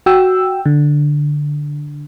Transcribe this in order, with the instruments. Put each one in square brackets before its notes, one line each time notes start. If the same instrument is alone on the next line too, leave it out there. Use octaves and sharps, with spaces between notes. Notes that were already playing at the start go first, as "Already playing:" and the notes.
[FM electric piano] F#4 G5 E6
D3